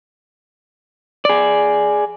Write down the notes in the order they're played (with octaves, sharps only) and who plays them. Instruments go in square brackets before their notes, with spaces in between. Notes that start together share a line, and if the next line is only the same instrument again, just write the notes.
[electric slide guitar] G#4 D5